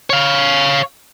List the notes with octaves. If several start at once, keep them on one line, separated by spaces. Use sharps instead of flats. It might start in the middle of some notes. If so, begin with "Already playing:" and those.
C#5 F5